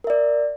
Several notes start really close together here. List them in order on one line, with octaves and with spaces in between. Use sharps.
A#4 E5 D5